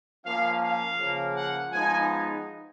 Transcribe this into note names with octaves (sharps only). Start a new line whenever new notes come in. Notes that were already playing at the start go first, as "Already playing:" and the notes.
F3 A#3 C#4 F5
F5
C#3 F3 A#3
F#5
F3 G#3 B3 D#4 G#5